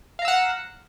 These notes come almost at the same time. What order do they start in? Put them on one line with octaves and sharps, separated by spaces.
F5 A#5 E6 F#5